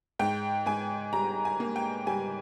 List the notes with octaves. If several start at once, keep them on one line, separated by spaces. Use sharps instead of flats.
G#2 G5
G#2 G#5
G3 A#5
G#5
A#3
G5
G3 G#5